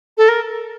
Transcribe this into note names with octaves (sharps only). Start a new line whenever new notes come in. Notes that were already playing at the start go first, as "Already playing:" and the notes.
A4
A#4